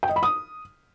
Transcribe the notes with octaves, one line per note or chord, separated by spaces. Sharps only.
G5
D#5
B5
D#6